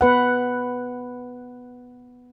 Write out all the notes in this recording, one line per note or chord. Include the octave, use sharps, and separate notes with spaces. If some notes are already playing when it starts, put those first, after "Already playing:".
B3 B4 F#5